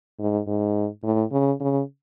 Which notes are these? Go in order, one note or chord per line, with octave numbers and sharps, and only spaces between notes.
G#2
G#2
A2
C#3
C#3